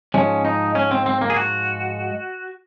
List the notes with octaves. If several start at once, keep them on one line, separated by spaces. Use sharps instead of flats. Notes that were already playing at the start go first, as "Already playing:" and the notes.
G#2 F3 G#3 C#4
D#4
C#4
C4
C4
A#3
G#4
F#4